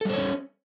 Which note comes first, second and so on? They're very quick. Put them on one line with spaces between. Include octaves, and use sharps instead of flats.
A4 G3 C5 C#5 C#4